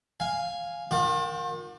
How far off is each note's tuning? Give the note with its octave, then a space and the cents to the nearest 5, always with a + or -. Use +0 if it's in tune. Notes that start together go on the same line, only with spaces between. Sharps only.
F5 +0 G#5 +0
D#3 +0 F4 +45 D6 +30